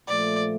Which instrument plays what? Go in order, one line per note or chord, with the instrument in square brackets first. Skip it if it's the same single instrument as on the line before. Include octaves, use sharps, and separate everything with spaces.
[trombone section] A#2 F3 A3 [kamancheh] D5